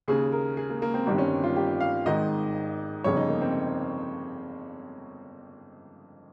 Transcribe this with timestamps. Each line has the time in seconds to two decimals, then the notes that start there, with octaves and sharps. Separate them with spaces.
0.08 D#2 C#3 G#4
0.32 A#4
0.57 G#4
0.70 A#3
0.82 A#3
0.94 C4
1.06 G1 G2 D#3 C4
1.18 C#4
1.43 F4
1.56 G4
1.80 F5
2.06 G#1 G#2 D#3 D#5
3.04 G1 F2 C#3 C#5
3.17 D#4
3.29 A#3
3.41 C4